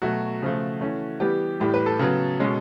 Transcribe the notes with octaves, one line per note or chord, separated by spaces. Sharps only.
B2 F#3 A3 F#4
C#3 F3 A3
E3 A3 C#4
E3 G3 B3 G4
A2 E3 G3 G4
B4
A4
C#3 F#3 B3
B2 G#3 C#4